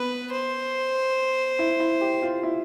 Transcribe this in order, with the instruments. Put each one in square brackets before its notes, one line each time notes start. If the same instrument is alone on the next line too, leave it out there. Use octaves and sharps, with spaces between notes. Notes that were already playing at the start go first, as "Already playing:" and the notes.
Already playing: [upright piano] B3 [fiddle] B4
[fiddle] C5
[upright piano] E4
E4
G4
F4
E4